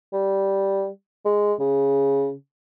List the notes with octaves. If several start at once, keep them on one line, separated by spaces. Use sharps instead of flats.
G3
G#3
C#3